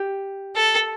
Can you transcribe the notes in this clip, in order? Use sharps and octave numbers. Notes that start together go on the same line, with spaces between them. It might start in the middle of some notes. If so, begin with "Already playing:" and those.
Already playing: G4
A4